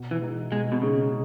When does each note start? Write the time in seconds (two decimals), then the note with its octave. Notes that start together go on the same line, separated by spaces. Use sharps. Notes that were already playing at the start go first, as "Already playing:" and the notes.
Already playing: B2
0.11 E3
0.21 G#3 D#4 G#4
0.51 B2 G#3
0.72 B2
0.82 C#3 G#3 D#4 G#4